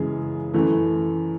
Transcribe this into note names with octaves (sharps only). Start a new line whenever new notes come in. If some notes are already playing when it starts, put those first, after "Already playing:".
Already playing: F#2 C#3 E3 G#3 G#4
F#2 E3 A3